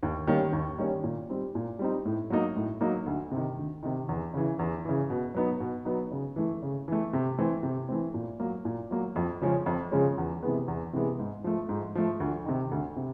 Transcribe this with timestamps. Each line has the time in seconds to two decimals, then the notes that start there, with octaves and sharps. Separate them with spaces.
0.03 D#2
0.27 D#3 G3 A#3 C#4
0.53 D#2
0.78 D#3 G3 A#3 C#4
1.04 A#2
1.29 G3 C4 D#4
1.55 A#2
1.79 G3 C4 D#4
2.05 A2
2.30 F#3 A#3 D#4
2.56 A2
2.81 F#3 A#3 D#4
3.06 D2
3.31 C3 D#3
3.57 D2
3.83 C3 D#3
4.09 E2
4.34 C#3 E3
4.59 E2
4.85 C#3 E3
5.10 B2
5.34 F#3 B3 D#4
5.60 B2
5.85 F#3 B3 D#4
6.11 C#3
6.36 E3 A3
6.62 C#3
6.88 E3 A3
7.13 C3
7.38 E3 A3 C4
7.63 C3
7.89 E3 A3 C4
8.14 A#2
8.40 F#3 A#3
8.65 A#2
8.91 F#3 A#3
9.16 F2
9.41 C#3 F3 G#3 C#4
9.66 F2
9.91 C#3 F3 G#3 C#4
10.18 E2
10.43 C3 E3 G#3 B3
10.68 E2
10.93 C3 E3 G#3 B3
11.19 G#2
11.44 F3 A3
11.69 G#2
11.95 F3 A3
12.20 D2
12.45 C3 D#3
12.71 D2
12.96 C3